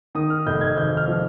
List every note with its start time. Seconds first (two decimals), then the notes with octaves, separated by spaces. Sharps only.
0.15 D#3 D#6
0.30 F6
0.46 F1 G6
0.61 G#6
0.77 G#1 G6
0.97 F6
1.08 F3